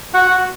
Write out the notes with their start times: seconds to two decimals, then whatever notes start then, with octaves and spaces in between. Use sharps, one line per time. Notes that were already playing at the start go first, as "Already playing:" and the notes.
0.14 F#4 F#5
0.31 F#4